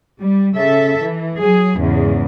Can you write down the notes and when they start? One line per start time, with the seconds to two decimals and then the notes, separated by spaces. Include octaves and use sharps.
0.21 G3
0.56 C#3 A4 E5
1.03 E3
1.40 F#3 G#4
1.78 E2 G#2 C#3